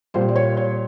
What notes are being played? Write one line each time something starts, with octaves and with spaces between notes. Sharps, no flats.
A#2 G3 C5
D5
C#5
C#5